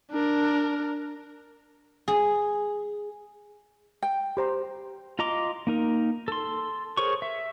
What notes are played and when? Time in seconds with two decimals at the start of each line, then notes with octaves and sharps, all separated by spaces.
0.11 D4 A#4
2.08 G#4
4.02 G5
4.37 G4 C5 A#5
5.19 F4 D#5 A#5 C6 D6
5.67 A#3 D#4 A#4
6.28 A4 C6
6.97 G#4 A#4 C5 C#5 C#6
7.22 E5